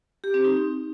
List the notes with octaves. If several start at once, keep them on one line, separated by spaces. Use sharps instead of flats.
G4
C4
D#4